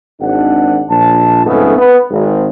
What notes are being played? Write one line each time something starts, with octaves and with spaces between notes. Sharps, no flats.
G#1 D4 F#5
A#1 A5
F2 G#2 C#3 G#3 A3 B3
B3
G#1